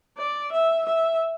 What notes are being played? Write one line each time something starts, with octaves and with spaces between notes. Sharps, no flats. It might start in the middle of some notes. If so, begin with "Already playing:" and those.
D5
E5
E5